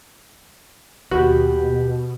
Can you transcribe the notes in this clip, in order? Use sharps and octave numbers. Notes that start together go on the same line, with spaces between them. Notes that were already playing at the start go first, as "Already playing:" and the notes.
D#2 B2 F#4 G4 B4